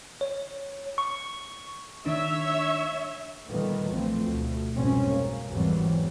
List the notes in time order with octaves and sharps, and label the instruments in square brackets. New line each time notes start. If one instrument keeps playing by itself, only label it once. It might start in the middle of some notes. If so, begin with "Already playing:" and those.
[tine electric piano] C#5
[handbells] C#6
[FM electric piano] D#3 D4 [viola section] C#5 E5
[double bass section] A#2 D3 D#3 G3 B3
B1 E3 F3 A3 C4
D2 B2
F1 C2 G#2 B2 C4 C#4
A#3
G#1 E2 E3 F#3 G3 C4